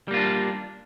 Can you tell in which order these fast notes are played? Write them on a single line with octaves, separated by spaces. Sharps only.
G3 A#3 F4 D4